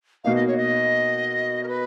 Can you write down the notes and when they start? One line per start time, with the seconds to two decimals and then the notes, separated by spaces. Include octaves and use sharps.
0.24 B2 A#3 D#4 F5
0.35 D#5
0.47 C#5
0.57 D#5
1.63 A#4
1.68 B4